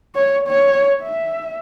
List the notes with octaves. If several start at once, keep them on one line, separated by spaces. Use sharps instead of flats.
C#5
C#5
E5